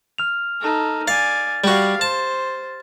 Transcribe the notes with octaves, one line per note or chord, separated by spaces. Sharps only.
F6 F7
D#4 A4
D5 F5 G#5 A6
G3 F#4 G4 F5
C5 A5